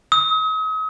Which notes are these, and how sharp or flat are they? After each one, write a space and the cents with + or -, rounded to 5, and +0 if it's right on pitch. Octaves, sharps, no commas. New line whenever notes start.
D#6 +40